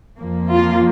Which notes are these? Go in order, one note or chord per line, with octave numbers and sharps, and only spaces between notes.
F2 F3 A#3
F4